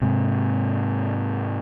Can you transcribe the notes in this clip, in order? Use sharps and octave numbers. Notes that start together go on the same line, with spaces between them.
G#2 C3